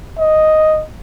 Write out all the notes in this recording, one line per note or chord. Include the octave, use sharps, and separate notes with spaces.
D#5